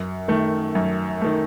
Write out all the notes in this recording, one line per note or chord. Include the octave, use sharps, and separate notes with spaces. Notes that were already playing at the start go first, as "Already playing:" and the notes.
Already playing: F#2
D#3 A3
F#2
D#3 A3